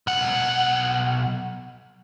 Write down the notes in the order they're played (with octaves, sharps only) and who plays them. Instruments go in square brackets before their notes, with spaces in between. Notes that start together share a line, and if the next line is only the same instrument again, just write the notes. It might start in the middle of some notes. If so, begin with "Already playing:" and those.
[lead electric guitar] B1 F#5